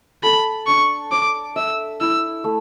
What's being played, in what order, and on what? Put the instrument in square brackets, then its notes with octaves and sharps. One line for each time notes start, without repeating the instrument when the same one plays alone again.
[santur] A4 [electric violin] B5
[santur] D4 [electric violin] C#6
[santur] C#5 [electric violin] D6
[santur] E5 [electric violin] E6
[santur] E4 [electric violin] E6
[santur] A3